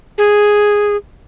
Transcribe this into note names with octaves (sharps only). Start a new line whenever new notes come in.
G#4